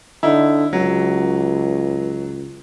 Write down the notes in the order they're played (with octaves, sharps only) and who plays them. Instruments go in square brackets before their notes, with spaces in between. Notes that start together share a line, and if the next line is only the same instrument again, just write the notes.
[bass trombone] D3 [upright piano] D#4 E4
[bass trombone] C#2 [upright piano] F#3